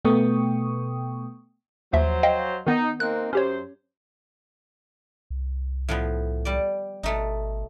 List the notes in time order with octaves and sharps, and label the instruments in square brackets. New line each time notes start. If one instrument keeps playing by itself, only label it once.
[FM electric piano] B2 A3 B3 G5 C#6 D#6
[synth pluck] D#2 F3 E5 [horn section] F#3 C5
[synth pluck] D#5 F5 G5
[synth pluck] D#3 B3 [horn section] D#4
[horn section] A#3 C4 D#4 [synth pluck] F#6
[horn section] F#2 C5 [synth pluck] C#4 G4 C#5
[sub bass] C2
[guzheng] A2 F3 B3
G3 D5
[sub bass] G#1 [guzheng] B2 A3 D#4